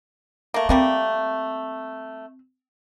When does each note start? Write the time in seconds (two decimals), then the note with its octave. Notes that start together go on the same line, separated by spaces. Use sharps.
0.54 A3 A#3
0.69 G3 A3 A#3 C4